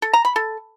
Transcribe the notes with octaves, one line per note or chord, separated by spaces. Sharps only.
A4
A#5
B5
A4